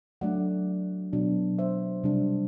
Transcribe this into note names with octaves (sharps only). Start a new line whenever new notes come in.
F#3 A3 D4 D5 F#5
B2 F#3 B3 D4
C5 E5
C3 G3 D4